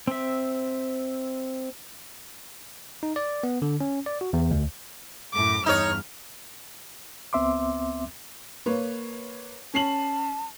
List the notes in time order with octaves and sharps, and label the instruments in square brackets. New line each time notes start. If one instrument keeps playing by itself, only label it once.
[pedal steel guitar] C4 E5
[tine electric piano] D#4
D5
B3
D3
C#4
D5
F#4
E2
D2
[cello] F#2 A2 [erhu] D6
[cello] E2 G2 [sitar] D#4 C#5 [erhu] F6
[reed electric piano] C#2 B3 C4 E5 C6 D6
[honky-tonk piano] A#3 B4 C#5
[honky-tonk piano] C#4 C7 F#7 [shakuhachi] A5